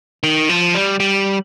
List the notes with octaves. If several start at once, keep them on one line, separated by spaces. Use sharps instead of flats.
D#3
F3
G3
G3